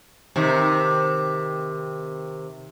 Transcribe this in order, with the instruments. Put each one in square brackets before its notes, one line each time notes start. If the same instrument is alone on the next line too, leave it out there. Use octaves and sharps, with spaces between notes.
[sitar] C3 D#3